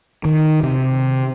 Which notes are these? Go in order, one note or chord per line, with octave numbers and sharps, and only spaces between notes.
D#3
C3